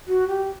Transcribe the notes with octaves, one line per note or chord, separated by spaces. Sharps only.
F#4
G4